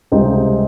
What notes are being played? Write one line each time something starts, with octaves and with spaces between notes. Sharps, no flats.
C#2 C3 G3 C4 D#4